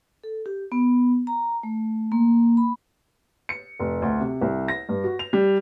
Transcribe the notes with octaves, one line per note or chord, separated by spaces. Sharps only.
A4
G4
B3
A#5
A3
A#3
B5
C#7
F1
D2
C3
C2
A#6
G2
F#4
F7
G3